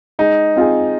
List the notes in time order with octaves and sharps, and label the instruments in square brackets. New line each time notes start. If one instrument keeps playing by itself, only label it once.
[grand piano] G#3 [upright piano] D#4
[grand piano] C4 F4 G#4